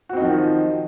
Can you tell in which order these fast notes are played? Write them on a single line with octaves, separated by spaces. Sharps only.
F#4 C4 D#4 D#3 F3